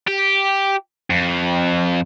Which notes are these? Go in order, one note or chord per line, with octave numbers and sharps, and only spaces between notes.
G4
F2